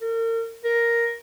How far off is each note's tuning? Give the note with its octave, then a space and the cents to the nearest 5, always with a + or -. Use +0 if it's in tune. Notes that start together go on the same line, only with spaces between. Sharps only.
A#4 -35
A#4 +5